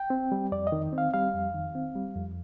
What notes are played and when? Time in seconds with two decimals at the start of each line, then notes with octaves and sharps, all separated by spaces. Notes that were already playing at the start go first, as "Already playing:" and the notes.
Already playing: G5
0.10 C4
0.32 G3
0.52 F2 D5
0.67 D#5
0.72 D#3
0.93 C4
0.98 F5
1.14 G3 F5
1.34 F2
1.55 D#3
1.75 C4
1.95 G3
2.16 F2